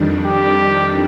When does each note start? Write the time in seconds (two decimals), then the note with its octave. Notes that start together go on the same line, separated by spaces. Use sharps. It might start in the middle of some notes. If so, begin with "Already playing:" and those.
Already playing: F2 D#3 G3 D4
0.26 G4